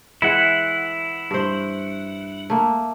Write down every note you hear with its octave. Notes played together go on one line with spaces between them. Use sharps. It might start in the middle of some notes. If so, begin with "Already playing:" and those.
E3 G#3 E4 F#5
G2 C5
A3 A#3